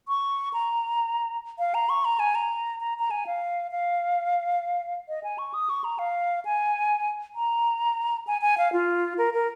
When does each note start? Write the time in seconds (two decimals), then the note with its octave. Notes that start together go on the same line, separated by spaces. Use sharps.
0.08 C#6
0.54 A#5
1.59 F5
1.74 A#5
1.89 C#6
2.05 A#5
2.20 G#5
2.35 A#5
2.80 A#5
2.99 A#5
3.11 G#5
3.27 F5
3.71 F5
5.09 D#5
5.24 G#5
5.38 C#6
5.54 D#6
5.70 C#6
5.84 A#5
5.99 F5
6.45 G#5
7.35 A#5
8.27 G#5
8.42 G#5
8.58 F5
8.73 F4
9.18 A#4
9.34 A#4